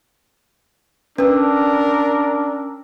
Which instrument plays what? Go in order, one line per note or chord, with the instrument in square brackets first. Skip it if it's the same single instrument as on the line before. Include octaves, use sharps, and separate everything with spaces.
[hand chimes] C#4 E6 [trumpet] D4 [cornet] A#4 [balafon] B4